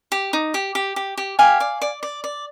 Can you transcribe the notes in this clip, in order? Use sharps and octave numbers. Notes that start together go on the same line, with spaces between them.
G4
D#4
G4
G4
G4
G4
G4 F5 G#5
D5
D5
D5
D5